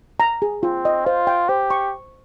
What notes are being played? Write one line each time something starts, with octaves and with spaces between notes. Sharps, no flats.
A#5
G#4
C4 F4
D#5
F4 C5
G5
G4 C5
C#6